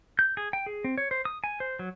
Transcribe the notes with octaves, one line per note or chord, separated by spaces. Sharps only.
G6
G#4
G5
G#4
C4
C#5
C5
D#6
G#5
C5
F#3